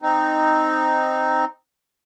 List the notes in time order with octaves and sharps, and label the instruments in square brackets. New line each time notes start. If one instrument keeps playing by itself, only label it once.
[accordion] C4 D#4